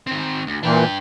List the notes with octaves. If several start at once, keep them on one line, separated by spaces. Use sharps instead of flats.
D#3 C4
D2
A#2 E3 D4 G5